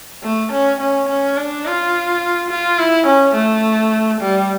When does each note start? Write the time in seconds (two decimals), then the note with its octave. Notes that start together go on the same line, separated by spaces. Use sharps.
0.23 A3
0.52 C#4
0.80 C#4
1.08 C#4
1.37 D4
1.66 F4
2.50 F4
2.78 E4
3.06 C#4
3.35 A3
4.21 G3